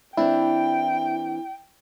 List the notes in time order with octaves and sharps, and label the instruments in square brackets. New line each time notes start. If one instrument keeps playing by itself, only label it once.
[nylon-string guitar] E3 C4 D4 [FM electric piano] E4 [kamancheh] G5